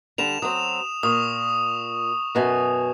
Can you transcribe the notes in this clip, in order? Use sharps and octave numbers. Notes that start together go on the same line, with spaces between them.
D3 G3 E7 F7
F#3 C4 D#6
A#2 C#6 D#6
F#2 B2 G#5